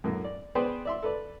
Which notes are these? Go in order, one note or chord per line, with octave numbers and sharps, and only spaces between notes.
F#2 A2 A#3
D5
B3 G#4 B4 C5 D5 G5
D5 E5 C6
A4 B4 D5